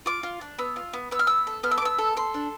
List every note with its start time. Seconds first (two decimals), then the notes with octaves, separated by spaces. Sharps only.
0.06 F4 D6
0.23 F4
0.41 D4
0.58 B3 E6
0.76 F4
0.93 B3
1.11 B3 E6
1.19 F6
1.27 B3 E6
1.47 A4
1.63 B3 F6
1.71 E6
1.78 D6
1.82 B3 E6
1.99 A4
2.17 A4 C6
2.34 D4